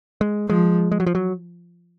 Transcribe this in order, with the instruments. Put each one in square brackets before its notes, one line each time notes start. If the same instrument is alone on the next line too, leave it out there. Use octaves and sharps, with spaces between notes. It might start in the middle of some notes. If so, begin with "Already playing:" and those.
[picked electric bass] G#3
[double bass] F3 [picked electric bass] G#3
[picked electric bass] G#3
F#3
F3
F#3